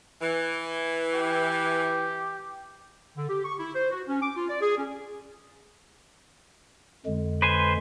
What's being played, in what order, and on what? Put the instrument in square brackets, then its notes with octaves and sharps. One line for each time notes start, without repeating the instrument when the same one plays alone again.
[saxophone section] E3
[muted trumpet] G4
[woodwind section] D3
G4
C#6
E4
C5
F#4
C#4
D6
F4
D5
G#4
C#4
[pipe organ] F2 D3 G#3
[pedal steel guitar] B4 C5 G#5